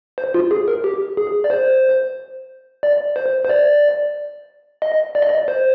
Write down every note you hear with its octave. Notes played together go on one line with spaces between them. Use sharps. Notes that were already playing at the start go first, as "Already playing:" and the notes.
C5
F4
G#4
A#4
G4
G#4
D5
C5
D5
C5
C5
D5
D#5
D5
D#5
D5
C5